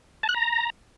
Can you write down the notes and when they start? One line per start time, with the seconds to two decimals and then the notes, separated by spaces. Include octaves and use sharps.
0.23 A5
0.29 F#6
0.34 A#5